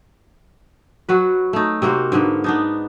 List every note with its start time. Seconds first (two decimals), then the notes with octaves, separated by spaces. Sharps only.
1.09 F#3 F#4 B4
1.53 A3 D#4
1.82 C3 A#3 F#4 C5
2.12 G#2 D3 A#3 B3
2.44 B3 D4 D#4